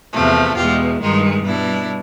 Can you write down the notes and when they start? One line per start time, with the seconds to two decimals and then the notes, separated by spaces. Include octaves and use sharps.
0.13 E2 C3 F3 A3
0.57 E2 B2 G#3 F4 G4
1.01 G2 D#3 G#3 D#4 F4
1.46 B2 G3 D4 E4